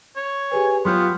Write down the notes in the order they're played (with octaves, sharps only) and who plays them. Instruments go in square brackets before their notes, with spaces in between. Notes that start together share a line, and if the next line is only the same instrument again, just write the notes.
[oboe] C#5
[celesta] G4 G#4 B4 [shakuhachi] G#5
[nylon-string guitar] F#3 G4 C#5 [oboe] B3 [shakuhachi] F4 [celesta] C6 F6 G6